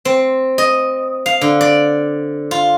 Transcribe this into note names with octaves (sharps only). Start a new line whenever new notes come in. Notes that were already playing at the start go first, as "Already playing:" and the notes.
C4
D#5
F5
D3
D5
F4